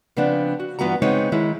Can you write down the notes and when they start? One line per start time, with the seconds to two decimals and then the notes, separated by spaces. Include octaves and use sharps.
0.17 C#3 F3 B3 C4 D4
0.60 F#4
0.79 G2 E3 B3 F4 F#4 A#5
1.02 C#3 G#3 B3 C4 D#4 C#5
1.32 D#3 G#3 E4